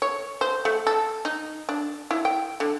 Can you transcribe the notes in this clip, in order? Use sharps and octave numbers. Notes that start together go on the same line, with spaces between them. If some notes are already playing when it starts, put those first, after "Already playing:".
C#5
C5
A3
A4
D#4
D4
E4
G5
D3